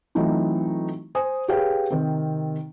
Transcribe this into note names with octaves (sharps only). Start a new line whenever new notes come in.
E3 F#3 A3 C4 D#4 F4
C5 G#5 D#6
G4 G#4 B4 C#5 F5 G5
C3 D#3 C4